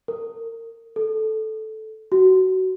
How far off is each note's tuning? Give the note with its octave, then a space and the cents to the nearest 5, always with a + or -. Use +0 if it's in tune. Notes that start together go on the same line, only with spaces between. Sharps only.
A#4 -30
A4 -10
F#4 +20